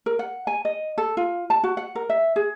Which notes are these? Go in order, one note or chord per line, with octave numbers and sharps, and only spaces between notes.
A#4
F#5
G#5
D#5
A4
F4
A5
F#4
F#5
A#4
E5
G#4